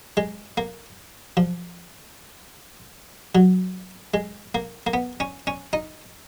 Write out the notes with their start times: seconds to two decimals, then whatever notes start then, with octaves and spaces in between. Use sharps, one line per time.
0.17 G#3
0.57 A#3
1.37 F3
3.35 F#3
4.14 G#3
4.55 A#3
4.87 A#3
4.94 B3
5.20 C#4
5.47 C#4
5.73 D#4